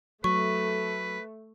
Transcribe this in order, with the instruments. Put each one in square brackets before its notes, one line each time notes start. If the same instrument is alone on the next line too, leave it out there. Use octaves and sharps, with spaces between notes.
[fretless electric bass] F#3 [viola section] A3 [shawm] B4 [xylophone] C#6